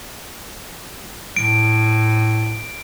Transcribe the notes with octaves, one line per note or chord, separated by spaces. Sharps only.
A2 D7